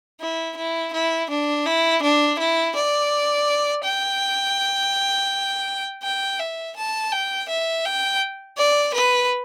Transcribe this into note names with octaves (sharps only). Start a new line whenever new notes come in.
E4
E4
E4
D4
E4
D4
E4
D5
G5
G5
E5
A5
G5
E5
G5
D5
B4